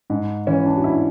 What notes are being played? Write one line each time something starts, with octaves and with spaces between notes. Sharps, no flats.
G#2
E3 C#4
D4
F#4
G#2 E4